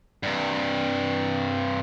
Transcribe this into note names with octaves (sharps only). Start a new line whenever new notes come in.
G2 C3